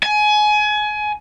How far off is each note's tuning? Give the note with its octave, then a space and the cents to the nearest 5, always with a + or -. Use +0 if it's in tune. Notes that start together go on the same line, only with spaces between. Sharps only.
G#5 +25